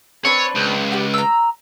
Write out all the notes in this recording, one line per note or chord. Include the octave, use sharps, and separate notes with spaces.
C4 D4 B4 C#5
C#2
G4 F#5
A#5 E6